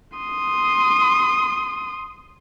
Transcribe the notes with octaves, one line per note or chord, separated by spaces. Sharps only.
C6 D#6